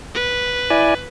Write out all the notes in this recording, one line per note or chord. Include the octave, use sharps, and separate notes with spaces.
B4
E4 D5 G#5